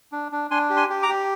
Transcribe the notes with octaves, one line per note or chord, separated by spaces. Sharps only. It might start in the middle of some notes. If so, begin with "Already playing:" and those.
D4
D4
D4 G#5 C6
G4
G#5 C6
G4
A#5 D6
G4